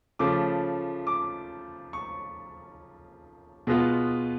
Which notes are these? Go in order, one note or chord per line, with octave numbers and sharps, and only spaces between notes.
C#3 F3 A3 D6
D6
C#6
B2 G#3 B3 F4